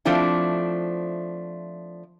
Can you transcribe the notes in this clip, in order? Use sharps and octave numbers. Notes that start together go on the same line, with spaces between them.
F3 A3 C4 D4 E4